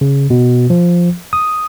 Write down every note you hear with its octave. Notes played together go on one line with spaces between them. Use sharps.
C#3
B2
F3
D#6